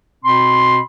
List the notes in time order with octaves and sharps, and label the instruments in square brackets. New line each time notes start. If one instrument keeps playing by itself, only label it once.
[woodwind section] B2 C4 B5 C6